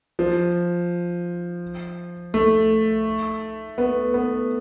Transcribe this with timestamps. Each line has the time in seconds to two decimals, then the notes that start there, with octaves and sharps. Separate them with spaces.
0.19 F3
2.34 A3
3.78 B3
4.14 B3